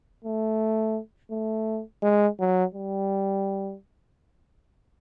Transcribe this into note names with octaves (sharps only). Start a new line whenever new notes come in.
A3
A3
G#3
F#3
G3